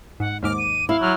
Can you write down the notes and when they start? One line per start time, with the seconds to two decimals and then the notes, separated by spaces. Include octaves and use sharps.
0.20 G#2 F#5
0.43 D#2 G#2 D6 F6
0.58 D#7
0.89 E4 F5
1.01 F#3 F6